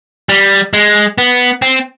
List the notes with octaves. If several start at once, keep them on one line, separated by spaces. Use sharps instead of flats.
G3
G#3
B3
C4